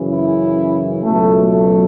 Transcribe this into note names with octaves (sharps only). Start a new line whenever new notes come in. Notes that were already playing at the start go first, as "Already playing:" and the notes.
Already playing: F#2 C#3 E3
E4
C#2 B2 F#3 A3
A3